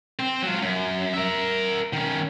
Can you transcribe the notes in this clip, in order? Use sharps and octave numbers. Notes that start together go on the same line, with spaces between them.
C4
F#3 F4
F#2
A#4 E5
D#3 C#4